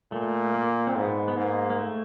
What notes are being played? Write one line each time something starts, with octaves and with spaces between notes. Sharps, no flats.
A#2 A3
A#3
C4
G#2 B3
B3
G#2 A#3
A#3
A3